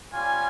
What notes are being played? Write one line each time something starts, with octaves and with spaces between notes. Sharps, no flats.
G3 C#4 F4 G#5